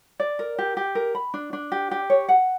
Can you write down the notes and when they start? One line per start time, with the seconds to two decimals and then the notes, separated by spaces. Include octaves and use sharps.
0.20 D5
0.39 A#4
0.58 G4
0.77 G4
0.95 A#4
1.15 B5
1.34 D4
1.53 D4
1.72 G4
1.91 G4
2.10 C#5
2.28 F#5